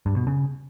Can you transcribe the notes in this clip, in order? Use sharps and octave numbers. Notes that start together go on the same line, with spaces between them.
G2
B2
C#3